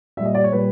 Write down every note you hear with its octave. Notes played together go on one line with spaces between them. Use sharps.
A#2 G3 D#5 E5
D5
C#5
A#2 G3 B4